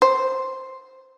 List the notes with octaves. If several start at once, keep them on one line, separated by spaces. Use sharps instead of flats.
C5